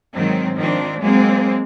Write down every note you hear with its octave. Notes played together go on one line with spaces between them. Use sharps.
G#2 D#3 F#3 C4
D#3 F3 C4 D4
F#3 G#3 A#3 C4